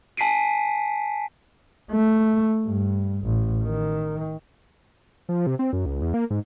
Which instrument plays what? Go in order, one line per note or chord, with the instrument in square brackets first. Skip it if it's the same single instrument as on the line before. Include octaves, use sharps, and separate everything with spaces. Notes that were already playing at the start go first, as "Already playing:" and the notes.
[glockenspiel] G#5 A5 B6 C7 D7 D#7
[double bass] A3
G2
A1
D#3
[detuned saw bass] F3
C3
C4
F#2
C#2
E2
A#3
G#2